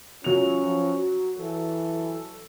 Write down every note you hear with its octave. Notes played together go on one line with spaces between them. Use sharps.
F#3 C#4 F4 F7
F3
F#4
E3 A4